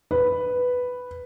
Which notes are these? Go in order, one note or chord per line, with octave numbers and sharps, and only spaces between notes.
B4